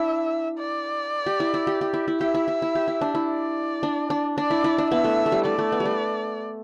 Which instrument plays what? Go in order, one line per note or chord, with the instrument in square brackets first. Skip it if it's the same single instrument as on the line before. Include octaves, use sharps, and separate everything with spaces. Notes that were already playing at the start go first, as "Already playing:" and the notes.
Already playing: [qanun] D4 E4 [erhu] E5
[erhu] D5
[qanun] G4
E4
E4
G4
G4
E4
E4
[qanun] G4 [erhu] E5
[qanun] E4
E4
E4
G4
E4
D4
E4
[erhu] D5
[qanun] D4
D4
[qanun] D4 [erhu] D5
[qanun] E4
E4
D4
[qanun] B3 [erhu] E5
[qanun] A3
A3
G3
[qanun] A3 [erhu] D5
[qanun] A3
B3
G3
A3